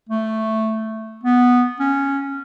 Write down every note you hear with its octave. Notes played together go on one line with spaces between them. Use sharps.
A3
B3
C#4